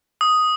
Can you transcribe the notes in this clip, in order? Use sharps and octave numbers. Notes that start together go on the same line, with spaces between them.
D#6